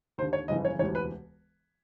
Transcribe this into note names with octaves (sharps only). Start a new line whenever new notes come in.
D#2 D3 C5
C#5
G1 F2 C#3 E3 D#5
C#5
E1 D2 C3 E3 C#5
B4